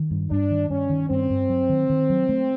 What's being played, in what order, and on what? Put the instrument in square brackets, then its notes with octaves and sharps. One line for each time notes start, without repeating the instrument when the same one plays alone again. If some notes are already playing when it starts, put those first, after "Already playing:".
Already playing: [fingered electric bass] D#3
G2
[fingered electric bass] G2 [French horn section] D4
[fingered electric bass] D#3
[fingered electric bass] G2 [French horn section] C#4
[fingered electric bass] D#3
[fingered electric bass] G2 [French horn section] C4
[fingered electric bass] G2
F#3
D#3
D#3
F#3
A3